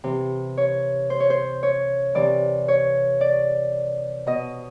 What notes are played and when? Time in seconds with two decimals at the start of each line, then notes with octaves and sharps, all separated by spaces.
0.04 C3 E3
0.57 C#5
1.10 C5
1.20 C#5
1.30 C5
1.63 C#5
2.15 C3 E3 D5
2.68 C#5
3.21 D5
4.27 B2 D#5